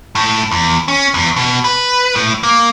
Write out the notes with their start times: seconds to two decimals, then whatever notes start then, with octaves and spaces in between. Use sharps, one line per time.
0.15 A2
0.51 E2
0.88 C#4
1.14 E2
1.36 B2
1.64 B4
2.15 A2
2.43 A#3